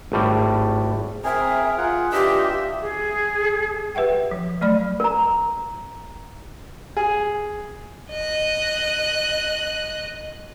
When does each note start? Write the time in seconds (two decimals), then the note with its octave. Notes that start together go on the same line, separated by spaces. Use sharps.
0.12 G#1 A2 G3
1.24 C4 G#4 A#4 E5
1.78 F4 G#4 F#5
2.12 E3 D4 F4 G4 D#5 E5
2.81 G#4
3.95 G4 B4 E5 F#5 G5
4.31 F3
4.61 F#3 A3 D5 B5
5.00 A#4 A#5
6.97 G#4
8.11 D#5 F#6